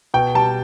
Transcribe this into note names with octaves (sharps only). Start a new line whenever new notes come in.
B2 G5
G3 A5